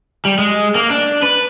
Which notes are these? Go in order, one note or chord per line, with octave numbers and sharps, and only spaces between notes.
G3
G#3
A#3
D4
B4